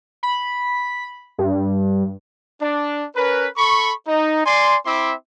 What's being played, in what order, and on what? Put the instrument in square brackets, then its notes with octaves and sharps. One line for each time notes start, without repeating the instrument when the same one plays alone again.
[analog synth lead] B5
G2
[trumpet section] D4
C#4 A#4 B4
A4 B5 C#6
D#4
D5 G#5 C6
C4 E4 E5 C6 D6